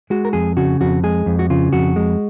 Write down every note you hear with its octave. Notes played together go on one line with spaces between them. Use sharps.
G#3 F#4
A#4
F2 G#4
C#3 F#4
F2 F#4
G#3 G#4
F2
F#4
C#3 F4
F2 F#4
G#3